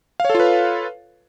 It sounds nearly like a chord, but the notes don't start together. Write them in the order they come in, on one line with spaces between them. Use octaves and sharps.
F5 C#5 A4 F4 B4